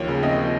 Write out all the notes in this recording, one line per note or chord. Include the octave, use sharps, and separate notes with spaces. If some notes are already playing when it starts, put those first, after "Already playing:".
Already playing: D#2 F3 C#5
C#3
C4 D#5
F3